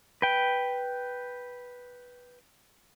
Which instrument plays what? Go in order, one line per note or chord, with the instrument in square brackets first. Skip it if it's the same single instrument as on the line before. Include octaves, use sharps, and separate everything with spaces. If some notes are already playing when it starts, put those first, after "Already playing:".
[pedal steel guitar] B4 G5